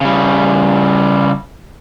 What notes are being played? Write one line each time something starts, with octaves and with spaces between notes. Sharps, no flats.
C#3 G3